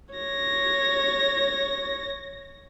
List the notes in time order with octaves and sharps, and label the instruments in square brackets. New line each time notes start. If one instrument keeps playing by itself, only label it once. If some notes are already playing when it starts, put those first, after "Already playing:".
[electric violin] C#5 A#6